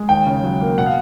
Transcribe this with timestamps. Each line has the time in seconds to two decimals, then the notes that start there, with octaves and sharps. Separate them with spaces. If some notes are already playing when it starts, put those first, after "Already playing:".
Already playing: G#3
0.09 D#2 G5
0.26 C#3
0.44 F#3
0.61 A#3
0.78 B2 F#5
0.86 F5